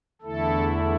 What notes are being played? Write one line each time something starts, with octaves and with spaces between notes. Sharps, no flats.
E2 D3 A3 E4 A4